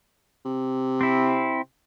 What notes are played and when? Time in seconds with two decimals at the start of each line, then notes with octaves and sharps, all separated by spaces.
0.45 C3
1.01 C4 E4